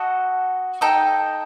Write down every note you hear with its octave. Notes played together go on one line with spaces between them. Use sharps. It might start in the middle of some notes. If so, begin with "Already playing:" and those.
Already playing: F#4 A4 D#5 F#5
D#4 A4 D#5 G5